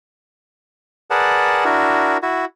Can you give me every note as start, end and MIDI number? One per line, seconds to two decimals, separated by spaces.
1.10 1.64 68
1.10 1.64 70
1.10 1.64 71
1.10 1.64 74
1.10 1.64 78
1.10 1.64 81
1.65 2.17 62
1.65 2.17 64
1.65 2.17 66
1.65 2.17 70
2.22 2.45 64
2.22 2.45 66